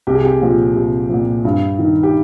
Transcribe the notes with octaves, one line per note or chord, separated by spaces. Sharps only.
C2 G4
G#4
G4
A#2 F3
C2
A#2 F3
G2
D#3
G4